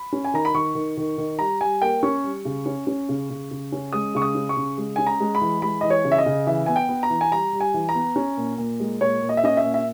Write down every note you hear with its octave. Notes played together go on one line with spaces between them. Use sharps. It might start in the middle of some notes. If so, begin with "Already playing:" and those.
Already playing: B5
C#4
G#5
D#3 A#5
B5
D#3 C#6
D#3
D#3
D#3
G3 A#5
G3 G#5
A#3 G5
C#4 C#6
G3
C#3
C#4
C#4
C#3
C#3
C#3
C#4
G#3 D#6
C#3 C#6
D#6
C#4
C#6
C#3
G#3
C#4 G#5
A#5
G#3
B5
E3
G#3 B5
E3 D#5
C#5
C#3
E5
D#5
C#3
E3 E5
B3 G#5
G5
B3
A#5
E3
G#5
G3 A#5
G3
G#5
E3
A#5
B3
C#4
A#2
A#2
G#3
A#2 C#5
A#2
D#5
E5
C#4 D#5
E5
A#2
E5